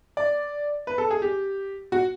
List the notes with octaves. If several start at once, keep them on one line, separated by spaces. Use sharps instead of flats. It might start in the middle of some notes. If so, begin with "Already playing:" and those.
D5
B4
A4
G#4
G4
F#4